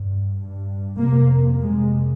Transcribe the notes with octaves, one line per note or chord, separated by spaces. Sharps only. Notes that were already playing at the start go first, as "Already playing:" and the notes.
Already playing: G2
G2
F2 C3 A#3
F2 C3 G#3